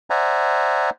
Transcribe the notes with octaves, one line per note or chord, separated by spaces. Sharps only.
C5 D5 E5 F#5 G#5 A#5